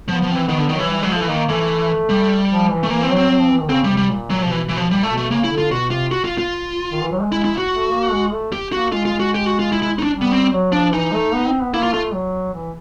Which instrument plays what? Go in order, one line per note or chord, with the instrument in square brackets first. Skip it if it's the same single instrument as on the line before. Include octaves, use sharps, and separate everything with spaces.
[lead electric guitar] F3 [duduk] B3
[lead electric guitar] F3
[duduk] C4
[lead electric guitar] E3
[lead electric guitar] D#3 [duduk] B3
[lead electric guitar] D3
D#3
[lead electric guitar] E3 [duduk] F#3
[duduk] G3
[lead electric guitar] F#3 [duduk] G#3
[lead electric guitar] F3 [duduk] A3
[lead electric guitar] E3
[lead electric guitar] D#3 [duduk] A#3
[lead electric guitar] E3 [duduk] A3
[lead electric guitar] G3
[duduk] F3
E3
[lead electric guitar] A3
[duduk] E3 [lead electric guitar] A#3
[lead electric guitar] C4
[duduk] F#3
[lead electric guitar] C4
[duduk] F#3
F3
E3
D#3
[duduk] C#3 [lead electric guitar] C4
[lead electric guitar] G3
[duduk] C3
[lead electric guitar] G3
[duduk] A#2
[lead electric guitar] F#3
[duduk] C3 [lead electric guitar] F3
[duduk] B2 [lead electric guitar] E3
[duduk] B2 [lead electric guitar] E3
[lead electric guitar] F3
[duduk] A#2 [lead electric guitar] G3
[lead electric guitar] A3
[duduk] B2
[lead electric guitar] A3
[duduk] C#3 [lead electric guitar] A#3
[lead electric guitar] E4
[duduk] D3
[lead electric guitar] F4
[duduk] B2 [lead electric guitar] F#4
[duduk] C3 [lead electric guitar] F4
[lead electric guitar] F#4
F4
F4
[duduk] D#3
E3
F#3
G3
G#3
[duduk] G#3 [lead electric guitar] E4
[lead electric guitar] E4
F#4
[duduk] A3
A#3
G#3
A3
[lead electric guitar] G4
[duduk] A#3 [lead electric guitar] F#4
[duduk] G#3 [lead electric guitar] F4
[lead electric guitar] F4
[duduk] G#3
[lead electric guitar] F#4
G4
F#4
F4
E4
E4
D#4
D4
[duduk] G3
[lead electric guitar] B3
C4
[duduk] F#3
[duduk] F3 [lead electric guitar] D4
[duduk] E3 [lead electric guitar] D#4
[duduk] A3
B3
C4
B3
[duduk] A#3 [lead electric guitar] E4
[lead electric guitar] F4
[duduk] A3 [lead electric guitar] F4
[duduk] F#3
E3